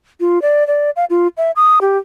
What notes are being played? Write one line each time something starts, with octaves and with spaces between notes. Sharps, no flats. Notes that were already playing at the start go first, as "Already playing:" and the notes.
F4
D5
D5
F5
F4
E5
D#6
G4